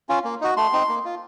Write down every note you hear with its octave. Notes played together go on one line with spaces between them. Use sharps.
C#4 F4
A#3
D#4 F#4
A3 C6
C4 D#4
A#3
F4